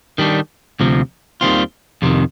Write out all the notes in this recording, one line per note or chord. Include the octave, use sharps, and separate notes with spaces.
D#3 G3 D4
D2 C3 F3
D#2 D#3 G3 C4 F4
F2 C3 D#3